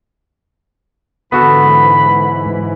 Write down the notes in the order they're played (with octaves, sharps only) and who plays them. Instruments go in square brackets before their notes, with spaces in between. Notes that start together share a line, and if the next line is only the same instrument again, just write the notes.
[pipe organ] G#2 E3 [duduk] D3 [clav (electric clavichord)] B3 F#4 A4 [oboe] B5